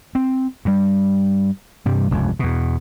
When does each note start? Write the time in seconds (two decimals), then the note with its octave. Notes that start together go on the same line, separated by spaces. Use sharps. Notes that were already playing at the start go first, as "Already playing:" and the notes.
0.15 C4
0.65 G2 G3
1.86 G2 C3 G3
2.11 F1 C#2 G2
2.39 E2 B2